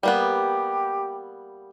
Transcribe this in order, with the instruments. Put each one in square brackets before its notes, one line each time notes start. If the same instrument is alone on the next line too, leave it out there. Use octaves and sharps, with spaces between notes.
[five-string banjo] G3 A#3 B3 [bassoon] G4